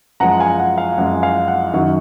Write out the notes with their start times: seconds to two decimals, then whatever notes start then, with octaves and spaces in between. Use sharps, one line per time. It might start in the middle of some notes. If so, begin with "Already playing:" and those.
0.20 F#2 F3 G#3 F#5 A#5
0.40 F5 G#5
0.60 F#5
0.78 F5
0.97 F#2 F3 G#3 F#5
1.22 F5 G#5
1.48 F#5
1.73 F#2 D#3 F#3 F#5